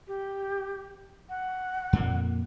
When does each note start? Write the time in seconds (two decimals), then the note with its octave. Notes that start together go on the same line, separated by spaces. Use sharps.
0.07 G4
1.29 F#5
1.93 F2 A#2 A#3